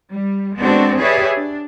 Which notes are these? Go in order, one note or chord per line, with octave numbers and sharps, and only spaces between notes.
G3
G#3 B3 C4 D4 F#4 A4
G4 G#4 B4 C#5 D5 E5
D4